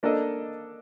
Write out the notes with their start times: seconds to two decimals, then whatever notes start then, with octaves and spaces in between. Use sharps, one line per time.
0.03 A#3 D4 A4 D#5